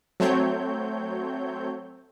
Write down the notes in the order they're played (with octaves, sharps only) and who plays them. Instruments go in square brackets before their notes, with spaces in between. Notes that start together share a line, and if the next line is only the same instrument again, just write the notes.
[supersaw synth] F#3 A3 C4 C#5 G6